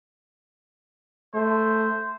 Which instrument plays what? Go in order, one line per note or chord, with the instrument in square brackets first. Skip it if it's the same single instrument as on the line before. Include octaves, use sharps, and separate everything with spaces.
[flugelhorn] A3 [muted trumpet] C5